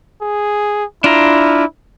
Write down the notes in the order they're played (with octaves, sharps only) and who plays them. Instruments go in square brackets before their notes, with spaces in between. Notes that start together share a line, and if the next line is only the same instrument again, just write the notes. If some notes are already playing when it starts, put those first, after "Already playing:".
[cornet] G#4
[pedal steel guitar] D4 F4 A#5 [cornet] E4